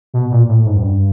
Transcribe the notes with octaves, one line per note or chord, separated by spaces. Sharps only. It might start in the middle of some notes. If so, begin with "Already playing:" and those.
B2
A#2
A2
G#2
F#2
G2